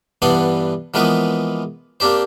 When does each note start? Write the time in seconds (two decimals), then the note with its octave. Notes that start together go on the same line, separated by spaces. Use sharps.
0.22 G2 E3 B3 D4 F#5 C6
0.94 E3 F3 G#3 A#3 B3 B4
2.00 A#3 C4 D4 G4 C5